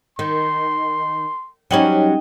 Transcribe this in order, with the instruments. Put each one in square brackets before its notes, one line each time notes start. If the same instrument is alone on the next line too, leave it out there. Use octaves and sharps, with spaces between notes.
[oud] D#3 [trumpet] C6
[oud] F#3 G3 C#4 [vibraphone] D#4 D#5 G5